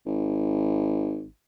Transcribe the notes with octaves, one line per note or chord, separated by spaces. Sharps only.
G#1